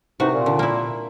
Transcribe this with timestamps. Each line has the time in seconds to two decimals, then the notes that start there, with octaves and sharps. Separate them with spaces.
0.20 C2 C3 E3 D#4 F#4
0.34 A#2
0.46 D3
0.59 A#3 E4